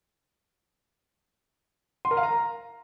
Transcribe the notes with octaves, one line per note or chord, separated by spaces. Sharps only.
C6
A#4
F5
A#5